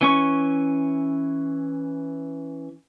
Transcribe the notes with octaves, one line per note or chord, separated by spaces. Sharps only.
E3 C#4 C#6